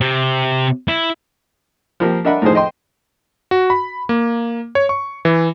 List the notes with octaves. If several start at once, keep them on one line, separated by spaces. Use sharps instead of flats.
C3
E4
F3 A#3 G4
D4 A#4 D#5 E5 F#5 B5
A2 D#3 F3 G#4 C5
C5 D#5 G5 C6
F#4
B5
A#3
C#5
C#6
E3